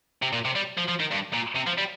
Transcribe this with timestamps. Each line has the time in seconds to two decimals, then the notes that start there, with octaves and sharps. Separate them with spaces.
0.22 C3
0.33 A#2
0.45 C3
0.56 G3
0.78 F3
0.89 F3
1.00 D#3
1.12 G2
1.34 A#2
1.56 C3
1.67 F3
1.78 G3